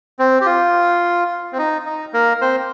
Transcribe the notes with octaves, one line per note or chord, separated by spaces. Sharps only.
C4
G4
F4
C4
D#4
D#4
A#3 A#4
C4 C5